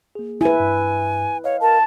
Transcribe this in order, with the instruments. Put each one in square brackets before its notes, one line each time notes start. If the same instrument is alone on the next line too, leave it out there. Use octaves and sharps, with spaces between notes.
[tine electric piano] A#3 G#4
[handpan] E4 B4 [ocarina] G#5
[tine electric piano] G2
[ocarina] C#5 [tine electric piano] D#5 F5
[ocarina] A#4 [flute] A5